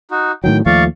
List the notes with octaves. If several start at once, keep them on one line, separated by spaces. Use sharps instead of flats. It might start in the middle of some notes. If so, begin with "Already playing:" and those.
D#4 F#4
A2 D#3 F#3 G5
D#2 F3 A3 D5 F5 C#6